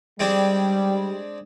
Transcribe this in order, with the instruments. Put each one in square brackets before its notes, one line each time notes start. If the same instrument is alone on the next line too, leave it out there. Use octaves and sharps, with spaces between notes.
[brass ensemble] G3 [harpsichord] G#3 C4 D4